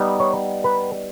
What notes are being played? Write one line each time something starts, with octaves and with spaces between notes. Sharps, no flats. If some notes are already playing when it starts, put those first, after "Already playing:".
Already playing: G3 B3 D#4
C#5
B4